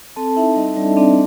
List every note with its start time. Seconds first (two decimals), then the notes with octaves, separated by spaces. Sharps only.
0.16 C4 A4 A5
0.36 D#4 E4 E5
0.56 G3 D#4 D#5
0.76 G3 D4 D5
0.97 C4 D4 D5